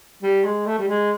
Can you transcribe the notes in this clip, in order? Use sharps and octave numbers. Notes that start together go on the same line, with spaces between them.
G3
G#3
A3
G3
G#3